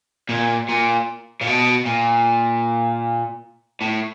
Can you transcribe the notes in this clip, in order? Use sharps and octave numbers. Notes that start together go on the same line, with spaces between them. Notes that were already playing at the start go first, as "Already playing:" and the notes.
A#2
A#2
A#2
B2
A#2
A2